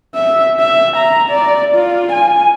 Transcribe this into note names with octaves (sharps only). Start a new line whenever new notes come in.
E5
E5
A#5
D5
F4
G#5